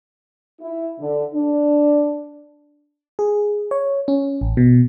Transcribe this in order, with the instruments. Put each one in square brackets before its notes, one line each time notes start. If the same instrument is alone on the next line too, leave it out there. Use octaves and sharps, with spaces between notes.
[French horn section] E4
D3
D4
[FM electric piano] G#4
C#5
C#4
A1
B2